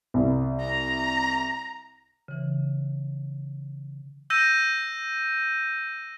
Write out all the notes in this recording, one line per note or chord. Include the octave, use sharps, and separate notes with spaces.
C2
A#5
C#3 E3
E6 G6 A#6 D#7